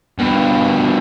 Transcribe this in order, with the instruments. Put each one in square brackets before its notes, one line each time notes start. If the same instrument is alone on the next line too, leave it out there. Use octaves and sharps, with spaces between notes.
[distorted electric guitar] G2 B2